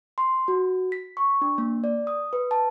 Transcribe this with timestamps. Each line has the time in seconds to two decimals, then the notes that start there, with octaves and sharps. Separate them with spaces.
0.18 C6
0.48 F#4
0.92 B6
1.17 C#6
1.42 D4
1.58 A#3
1.84 D5
2.07 D#6
2.33 B4
2.51 A5